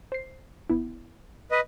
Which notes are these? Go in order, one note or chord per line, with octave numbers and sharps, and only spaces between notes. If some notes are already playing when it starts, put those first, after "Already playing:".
C5 C7
G1 B3 E4
B4 D#5